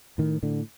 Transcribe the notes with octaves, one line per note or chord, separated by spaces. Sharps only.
A2 D#3
A2 D3